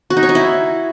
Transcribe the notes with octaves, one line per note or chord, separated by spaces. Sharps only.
F#4
D#4
C#5
D#4
E4